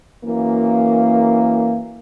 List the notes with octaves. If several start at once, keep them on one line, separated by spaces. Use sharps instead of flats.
F#2 E3 A#3